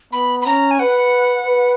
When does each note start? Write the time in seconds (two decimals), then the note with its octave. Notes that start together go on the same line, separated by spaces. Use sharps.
0.12 B3 B5
0.42 B5
0.46 C#4 A#5
0.71 G#5
0.79 B4 F#5
1.46 B4